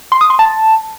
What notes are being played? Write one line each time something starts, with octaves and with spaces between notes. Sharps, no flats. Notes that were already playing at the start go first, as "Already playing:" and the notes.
C6
D#6
C6
A5